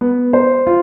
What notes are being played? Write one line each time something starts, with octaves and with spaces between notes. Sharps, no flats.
B3
C5
F4